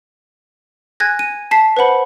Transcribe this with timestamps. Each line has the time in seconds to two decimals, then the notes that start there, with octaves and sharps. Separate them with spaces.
1.00 G#5 F#6 G#6 A#6
1.19 D#7
1.51 A5 B6 C7
1.77 B4 C5 F#5 B5